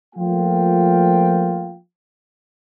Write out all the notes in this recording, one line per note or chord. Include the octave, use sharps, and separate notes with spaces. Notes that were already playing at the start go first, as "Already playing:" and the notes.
F3 A3 A#3 F4 G5